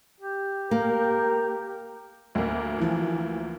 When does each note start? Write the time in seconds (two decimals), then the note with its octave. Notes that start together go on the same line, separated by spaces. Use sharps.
0.21 G4
0.71 A#3 A#4
2.35 D2 A#3
2.78 E3 F3